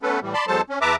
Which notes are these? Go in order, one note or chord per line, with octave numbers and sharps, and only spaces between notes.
A3 B3 C#4 A4 B4
A2 E3 G3
D5 A5 B5 C6
E2 F#3 G#3 A4 C5 A5
C#4
E2 B4 E5 A5 A#5 D6